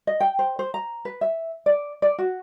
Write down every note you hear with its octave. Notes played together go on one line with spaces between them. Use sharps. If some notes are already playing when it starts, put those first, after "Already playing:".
D#5
G5
C5
C5
A#5
B4
E5
D5
D5
F#4